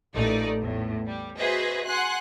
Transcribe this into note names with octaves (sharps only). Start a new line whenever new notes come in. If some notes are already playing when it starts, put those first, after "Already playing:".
A1 A#2 A3 D#4 D5
E2 A2
G3
F#4 G#4 B4 C5 D#5 E5
F#5 G#5 C6 F#6